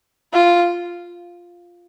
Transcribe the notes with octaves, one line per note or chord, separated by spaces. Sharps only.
F4